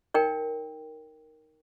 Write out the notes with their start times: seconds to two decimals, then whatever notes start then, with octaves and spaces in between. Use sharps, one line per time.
0.14 D#4 A#4 C#5 G5